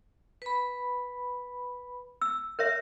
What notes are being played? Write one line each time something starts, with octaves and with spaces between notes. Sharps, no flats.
B4 B5
E6
A#4 C#5 E5